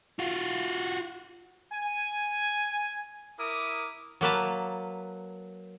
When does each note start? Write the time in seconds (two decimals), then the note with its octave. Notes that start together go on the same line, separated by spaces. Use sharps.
0.19 F4 F#4
1.73 G#5
3.39 E4 A#4 D6 D#6
4.21 F#3 A#3 B4 A5